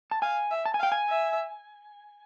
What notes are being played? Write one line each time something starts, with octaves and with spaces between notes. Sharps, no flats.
A5
F5 G#5
E5
A5
G#5
F5 G5
G#5
E5